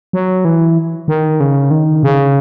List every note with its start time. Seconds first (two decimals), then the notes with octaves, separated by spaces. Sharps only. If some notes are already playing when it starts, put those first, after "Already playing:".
0.13 F#3
0.45 E3
1.08 D#3
1.40 C#3
1.71 D#3
2.03 C#3